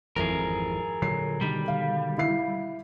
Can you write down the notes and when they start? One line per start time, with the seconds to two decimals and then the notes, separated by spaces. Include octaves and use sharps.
0.16 G#1 F2 E3 G#4 A#4
1.02 A#2 D3 F#3 C7
1.41 B2 D3 D#3 G3
1.68 F5
2.18 E4 F5 C7